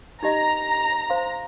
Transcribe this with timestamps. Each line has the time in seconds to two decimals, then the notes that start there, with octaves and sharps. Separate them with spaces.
0.23 D#4 G4 D#5 A#5
1.10 C5 F5 C6